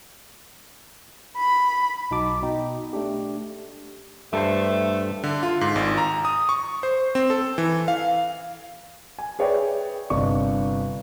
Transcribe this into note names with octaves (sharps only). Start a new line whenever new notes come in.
B5
B1 D#4 F#4 A5 D6
B2 D#4 G5
A3 D4 G4
G2 A3 A4 C5
D3
F4
G#2
G#1
A#5
D#6
C#6
C5
C4
A4
E3
F5
G#5
G#4 B4 C#5 D5 E5 G5
G1 C3 D4 D#5 C#6